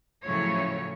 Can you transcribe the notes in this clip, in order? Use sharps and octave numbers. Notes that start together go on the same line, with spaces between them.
A2 C#3 F3 F#3 E4 C#5